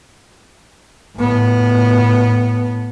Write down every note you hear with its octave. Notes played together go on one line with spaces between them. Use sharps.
A2 B3